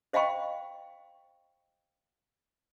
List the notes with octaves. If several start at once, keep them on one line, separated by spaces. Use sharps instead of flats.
C5 D#5 F5 G5 B5 C#6